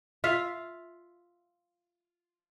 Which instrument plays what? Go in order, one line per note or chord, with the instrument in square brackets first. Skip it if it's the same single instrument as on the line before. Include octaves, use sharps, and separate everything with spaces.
[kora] F4 E5 F5